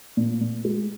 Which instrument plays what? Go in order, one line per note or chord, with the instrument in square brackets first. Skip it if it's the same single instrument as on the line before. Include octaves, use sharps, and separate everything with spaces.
[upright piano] A#2
A#2
G#3